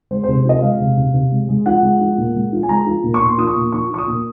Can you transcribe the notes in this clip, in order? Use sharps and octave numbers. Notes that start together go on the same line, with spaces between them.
G#3 C5
C5
C3
F3 D#5
G#3 F5
C3
C3
C3
G#3
G#3
F3 F#5
G#3
F3
A#2
G#3
F3
G#5
G#3 A#5
F3
A#2
C#6
A#2 C6
F3 D#6
C#6
A#2
F3 C#6
F3 C#6
D#6
A#2